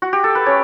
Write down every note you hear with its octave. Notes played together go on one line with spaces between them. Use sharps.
F#4
G4
A4
B4
A3 C#4 C#5